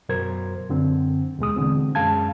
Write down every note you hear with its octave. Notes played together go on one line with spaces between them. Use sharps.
F#2 B2 F#3 A#4 C5 G#6
F#2 D3 C4
D#2 B2 G#3 D#6
B2 D3 E3 G#3 C4
F#2 G#3 C#4 F5 A5 G#6